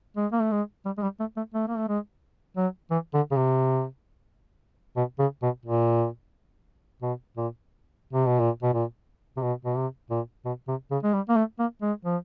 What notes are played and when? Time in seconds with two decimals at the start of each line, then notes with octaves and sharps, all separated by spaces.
0.17 G#3
0.32 A#3
0.42 A3
0.52 G#3
0.86 G3
0.98 G#3
1.02 G3
1.20 A3
1.37 A3
1.54 A3
1.68 A#3
1.78 A3
1.88 G#3
2.57 F#3
2.91 E3
3.14 D3
3.31 C#3
3.37 C3
4.97 B2
5.19 C#3
5.42 B2
5.66 A#2
7.02 B2
7.37 A#2
8.13 C3
8.27 B2
8.40 A#2
8.63 B2
8.74 A#2
9.37 C3
9.42 B2
9.65 B2
9.76 C3
10.10 A#2
10.45 B2
10.68 C3
10.91 C#3
11.03 G#3
11.14 G3
11.29 A#3
11.37 A3
11.59 A#3
11.82 G#3
12.05 F3